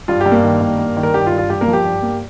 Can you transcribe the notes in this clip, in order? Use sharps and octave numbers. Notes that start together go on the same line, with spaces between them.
G2 F4
G4
G2
A#3 A#4
D#3
G2
G2
D#3
A#4
G2 G4
F4
G2
F4
G2 G4
A#3 A#4
F3
G4
G2
A#3